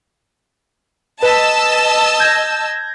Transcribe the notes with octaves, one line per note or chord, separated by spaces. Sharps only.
B4 D#5 A5 E6 B6
G6 G#6 A#6